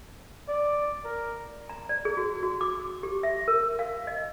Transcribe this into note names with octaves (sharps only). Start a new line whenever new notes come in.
D5
A#4
A#5
D5
G#4
F#4
F#4
D6
G4
E5
A#4
F5
D#5